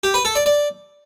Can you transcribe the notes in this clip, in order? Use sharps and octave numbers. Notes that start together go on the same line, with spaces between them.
G4
B4
A4
D5
D5